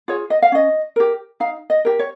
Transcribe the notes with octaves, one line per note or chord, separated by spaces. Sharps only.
F4 G#4 C#5
D#5
F5
C#4 D#5
G4 A#4
D#4 F5
D#5
G4 A#4
C#5